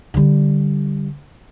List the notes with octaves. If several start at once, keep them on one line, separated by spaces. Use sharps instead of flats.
D3 G3